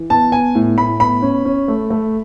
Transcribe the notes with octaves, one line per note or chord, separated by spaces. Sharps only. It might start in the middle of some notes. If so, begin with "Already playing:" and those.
Already playing: E3
B3 A5
B3 G#5
A2
A2 B5
B3 B5
C#4
C#4
A3
A3